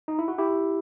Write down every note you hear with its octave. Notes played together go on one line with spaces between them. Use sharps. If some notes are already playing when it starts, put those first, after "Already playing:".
D#4
E4
F#4
E4 G4